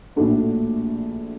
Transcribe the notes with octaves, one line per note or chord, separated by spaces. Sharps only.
A#1 A2 A3 D4 F#4